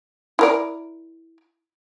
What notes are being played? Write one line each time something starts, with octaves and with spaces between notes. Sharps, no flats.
E4 A#4 D5